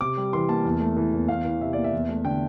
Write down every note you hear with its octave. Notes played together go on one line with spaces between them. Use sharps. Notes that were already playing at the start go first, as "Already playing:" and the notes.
C3 D6
G3
E3 C6
A#3 A5
E2
A3
E3
E2
E2 F5
E3
C3 E5
A#3 D5
E5
E2
A3
D3 G5